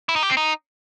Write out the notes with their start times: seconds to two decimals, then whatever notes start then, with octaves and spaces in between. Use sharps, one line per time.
0.09 E4
0.16 D#4
0.23 G4
0.30 C4
0.37 D#4